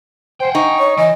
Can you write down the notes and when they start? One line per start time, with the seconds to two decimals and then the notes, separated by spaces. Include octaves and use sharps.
0.40 C5 F#5 G5
0.55 D#4 C#6
0.79 C#5
0.97 E3 D#5